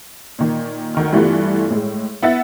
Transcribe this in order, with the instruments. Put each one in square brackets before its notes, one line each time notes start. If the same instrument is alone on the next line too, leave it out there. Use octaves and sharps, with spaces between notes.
[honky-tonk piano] A#2 D#3
D2 D#3 F6
G2 E3 G3 A3 B3 F4
A2 G#3
B3 E4 E5 F#5 A6